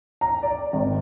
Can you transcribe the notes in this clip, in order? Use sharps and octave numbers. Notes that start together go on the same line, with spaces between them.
A#5
D5
G#1